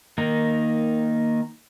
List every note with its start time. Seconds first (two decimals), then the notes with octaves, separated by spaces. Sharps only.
0.18 D#3 A#3 D#4